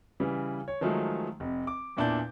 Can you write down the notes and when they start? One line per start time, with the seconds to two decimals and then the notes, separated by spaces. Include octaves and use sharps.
0.20 C#3 E3 G3
0.68 C#5
0.81 D#3 F3 F#3 G#3 A3
1.40 F1 C3
1.67 D6
1.97 E2 A#2 D4 E4 A5 G6